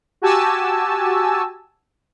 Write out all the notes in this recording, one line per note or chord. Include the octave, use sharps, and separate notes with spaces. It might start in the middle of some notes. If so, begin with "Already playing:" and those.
F#4 G4 G#5 A5 E6